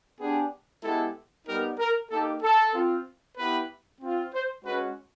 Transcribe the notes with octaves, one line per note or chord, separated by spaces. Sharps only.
B3 D4 G4 G#4
G#3 B3 E4 G4 A4
G3 B3 D#4 G4 A#4
A#4
A#3 D#4 G4 A4
A4
C4 F4
B3 E4 G4 B4
C4 F4
C5
G#3 C#4 F#4 B4